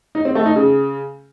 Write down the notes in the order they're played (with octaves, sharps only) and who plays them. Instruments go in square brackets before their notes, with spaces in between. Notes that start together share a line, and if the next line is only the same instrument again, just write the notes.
[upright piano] D#4
C4
A3
D#4
C#3